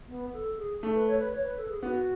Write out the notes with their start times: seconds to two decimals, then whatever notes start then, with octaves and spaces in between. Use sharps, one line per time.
0.09 B3
0.33 A4
0.58 G#4
0.83 A3
0.95 B4
1.07 C#5
1.19 B4
1.33 C#5
1.45 B4
1.58 A4
1.69 G#4
1.83 B3 F#4